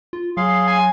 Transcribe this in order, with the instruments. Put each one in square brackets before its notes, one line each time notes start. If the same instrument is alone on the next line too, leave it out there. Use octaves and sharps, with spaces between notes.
[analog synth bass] F4
[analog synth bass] F#3 [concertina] G#4 F5 C6
[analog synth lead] G#5